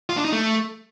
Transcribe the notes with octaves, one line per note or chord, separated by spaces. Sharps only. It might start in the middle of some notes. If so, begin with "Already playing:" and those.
F4
D4
D#4
A3